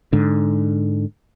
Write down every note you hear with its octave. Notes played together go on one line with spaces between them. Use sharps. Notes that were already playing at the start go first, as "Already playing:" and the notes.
G#2 D3